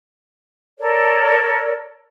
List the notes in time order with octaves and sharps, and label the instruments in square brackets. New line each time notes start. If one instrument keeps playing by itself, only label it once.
[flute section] A4 A#4 C#5 D5